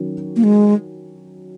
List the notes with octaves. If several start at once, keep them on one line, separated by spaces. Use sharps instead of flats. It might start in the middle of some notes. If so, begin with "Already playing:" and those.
Already playing: D#3 F#3 C#4
A#3
G#3